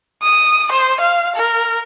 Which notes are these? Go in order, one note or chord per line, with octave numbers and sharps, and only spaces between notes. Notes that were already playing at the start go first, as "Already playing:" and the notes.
D#6
C5
F5
A#4